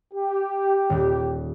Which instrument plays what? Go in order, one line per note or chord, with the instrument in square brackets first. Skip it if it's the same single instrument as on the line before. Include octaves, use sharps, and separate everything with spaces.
[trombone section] G4
[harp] D#1